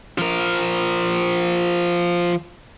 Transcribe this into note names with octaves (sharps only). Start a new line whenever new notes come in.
F3 A#4